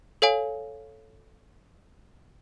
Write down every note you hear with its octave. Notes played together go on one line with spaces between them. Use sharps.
A4 C#5 F5 G#5